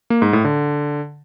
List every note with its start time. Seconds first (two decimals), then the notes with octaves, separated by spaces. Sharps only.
0.10 A#3
0.22 G#2
0.33 A2
0.45 D3